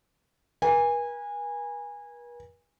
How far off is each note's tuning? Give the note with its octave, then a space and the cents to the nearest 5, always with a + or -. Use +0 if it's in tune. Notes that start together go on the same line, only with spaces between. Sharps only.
B4 -45 G#5 -20